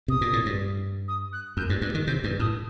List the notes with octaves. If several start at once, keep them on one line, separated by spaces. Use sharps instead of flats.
C3 D#6
A#2
A2
G2
D#6
F#6
F#2 G6
G2 F#6
G2 F#6
D#3
C3 G6
G2
A2 D#6